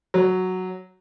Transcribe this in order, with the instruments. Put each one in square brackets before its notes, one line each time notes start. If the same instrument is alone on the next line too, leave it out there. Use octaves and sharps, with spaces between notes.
[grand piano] F#3